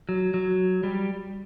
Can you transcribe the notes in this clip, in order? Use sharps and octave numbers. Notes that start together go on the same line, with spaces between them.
F#3
F#3
G3